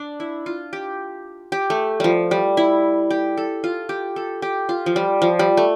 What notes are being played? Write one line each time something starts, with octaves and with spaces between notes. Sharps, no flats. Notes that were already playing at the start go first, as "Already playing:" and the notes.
Already playing: D4
E4
F4
G4
G4
A3
F3 G3
G3
E4
G4
A4
F4
G4
A4
G4
F4
F3
G3
F3
G3
A3